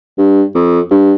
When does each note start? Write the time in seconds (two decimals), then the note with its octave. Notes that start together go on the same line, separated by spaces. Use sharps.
0.18 G2
0.55 F2
0.91 G2